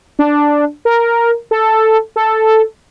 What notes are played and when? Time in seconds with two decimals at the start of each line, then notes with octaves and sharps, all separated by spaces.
0.19 D4
0.85 A#4
1.51 A4
2.16 A4